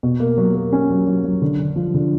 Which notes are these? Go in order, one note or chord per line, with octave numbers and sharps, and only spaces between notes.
B2
A#3
F#3
A#3
C#4
F#3
F#3
F#3
D3
D3
F3
D3